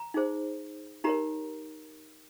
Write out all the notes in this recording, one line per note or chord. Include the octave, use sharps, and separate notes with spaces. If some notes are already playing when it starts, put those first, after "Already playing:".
Already playing: A#5
D#4 G#4 C5
D#4 G4 A#4 C#5 A#5